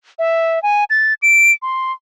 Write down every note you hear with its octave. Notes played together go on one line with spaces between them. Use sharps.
E5
G#5
A6
D7
C6